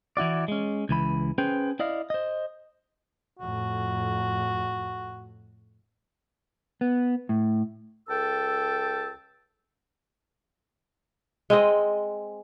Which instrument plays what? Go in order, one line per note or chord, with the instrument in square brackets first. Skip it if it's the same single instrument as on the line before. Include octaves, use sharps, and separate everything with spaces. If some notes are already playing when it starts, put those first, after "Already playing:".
[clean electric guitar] E3 E4 F#4 D5
G#3 C#4
C#2 E3 B5
C#4 G#4 B4 C5 G5
E4 D5 D#5 F5
C5 D#5
[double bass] F2 A2 [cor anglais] F#4
[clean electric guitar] B3
A2
[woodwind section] C#2 A4 G5 A5 E6
[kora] G#3 C4 D#5